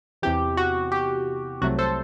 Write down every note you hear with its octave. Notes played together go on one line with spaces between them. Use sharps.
E2 C3 E3 G4
F#4
G4
C2 C3 F#3 A3 F#4
A4 C5